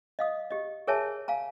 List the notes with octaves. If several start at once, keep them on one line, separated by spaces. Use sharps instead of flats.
D#5 F5 D#6
G4 D#5
G#4 A#4 C#5 E5 G#5 A5
F5 G#5 A#5